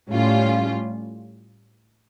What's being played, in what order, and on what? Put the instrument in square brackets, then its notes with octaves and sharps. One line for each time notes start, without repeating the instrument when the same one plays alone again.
[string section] A2 G3 C#4 F4